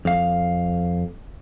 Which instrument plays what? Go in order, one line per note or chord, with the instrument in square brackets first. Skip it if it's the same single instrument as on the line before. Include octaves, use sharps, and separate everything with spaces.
[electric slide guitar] F2 F5